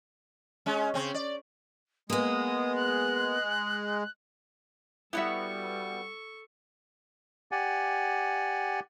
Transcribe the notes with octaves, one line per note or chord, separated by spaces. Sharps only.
G#3 C#4
C#3 C4
D5
G#3 A#3 B3 D#6
F#6
G3 B3 D#4 E4 F#4 A4 E5 C#6
G4 D5 F#5 G#5